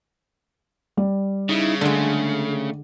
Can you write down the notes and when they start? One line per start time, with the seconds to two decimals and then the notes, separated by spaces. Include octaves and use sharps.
0.97 G3
1.49 C#3 D#4 E4
1.81 D3 G#3 A3